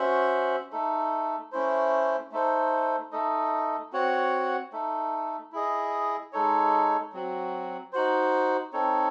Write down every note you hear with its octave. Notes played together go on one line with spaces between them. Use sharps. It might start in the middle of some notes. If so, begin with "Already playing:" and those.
Already playing: C#4 F#4 C5 E5
A3 D#4 A4
A3 C#4 E4 C5
A3 D#4 A4 C5
A3 D#4 A4 D#5
C4 F#4 C#5 F#5
A3 D#4 A4
E4 G#4 D#5
G#3 D#4 A4 C#5
F#3 C4 F#4
D#4 F#4 C5
C4 D#4 A4 C#5